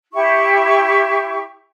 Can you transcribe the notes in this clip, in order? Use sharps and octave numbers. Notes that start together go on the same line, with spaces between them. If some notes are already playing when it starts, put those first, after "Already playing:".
E4 G4 C#6